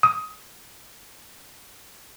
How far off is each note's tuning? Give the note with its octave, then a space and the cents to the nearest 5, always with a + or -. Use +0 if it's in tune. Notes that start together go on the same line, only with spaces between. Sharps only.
D#6 +20